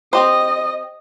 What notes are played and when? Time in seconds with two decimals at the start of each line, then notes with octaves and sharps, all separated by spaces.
0.13 C4 G4 C5 D#5 D#6